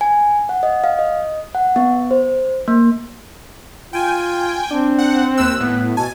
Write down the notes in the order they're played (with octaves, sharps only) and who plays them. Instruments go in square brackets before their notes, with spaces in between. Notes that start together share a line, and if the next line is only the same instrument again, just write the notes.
[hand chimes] G#5
F#5
D#5
F5
D#5
F#5
B3
C5
A#3
[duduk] F4 [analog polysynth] G5 G#5
[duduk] C4 [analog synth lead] D4
[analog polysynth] F#5
[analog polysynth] D#2 E6 [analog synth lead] F#6
[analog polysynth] A2 [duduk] B3
[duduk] B2 [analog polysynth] G#5 [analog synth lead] A5